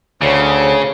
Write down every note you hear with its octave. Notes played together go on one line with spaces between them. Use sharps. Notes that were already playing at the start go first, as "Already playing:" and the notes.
D2 C#3 C#5